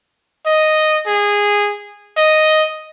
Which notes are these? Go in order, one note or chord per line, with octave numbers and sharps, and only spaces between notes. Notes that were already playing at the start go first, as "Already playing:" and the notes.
D#5
G#4
D#5